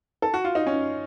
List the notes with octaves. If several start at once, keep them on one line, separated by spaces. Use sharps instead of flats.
A4
F#4
F4
D#4
C#4